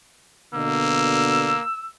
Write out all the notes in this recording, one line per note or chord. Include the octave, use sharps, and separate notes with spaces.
B2 D3 A#3 E6